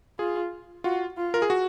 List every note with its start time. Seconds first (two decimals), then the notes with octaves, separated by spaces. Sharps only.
0.19 F4 G#4
0.84 F4 F#4
1.17 F4
1.34 A#4
1.42 G#4
1.50 F#4